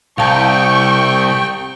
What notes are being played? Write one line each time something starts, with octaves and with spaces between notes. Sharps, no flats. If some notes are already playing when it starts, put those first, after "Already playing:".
C2 F5 G5 A5 C#6